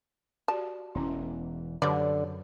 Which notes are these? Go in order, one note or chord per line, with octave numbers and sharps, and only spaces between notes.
F#4 G4 D5 A5
E1 E2 E3 C#4 E4
F#2 D3 F#3 G3 B4 C#5 D5